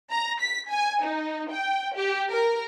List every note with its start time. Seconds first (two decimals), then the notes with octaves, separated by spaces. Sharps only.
0.11 A#5
0.41 B6
0.70 G#5
1.03 D#4
1.51 G5
1.96 G4
2.31 A#4